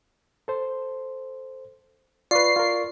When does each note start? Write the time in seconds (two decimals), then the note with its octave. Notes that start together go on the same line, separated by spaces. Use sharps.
0.48 A4 C5
2.31 F4 B4 D5 C#6 C7
2.56 F4 A#4